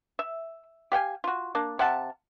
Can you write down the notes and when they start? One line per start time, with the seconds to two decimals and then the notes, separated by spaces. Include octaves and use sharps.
0.19 E5
0.92 G4 F5 G5 G#5
1.24 F4 F#4
1.55 A#3 D4
1.79 C3 F5 F#5 A5